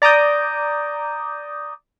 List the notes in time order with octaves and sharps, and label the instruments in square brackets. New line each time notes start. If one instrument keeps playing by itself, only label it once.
[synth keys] D5 A#5 D6 D#6 G6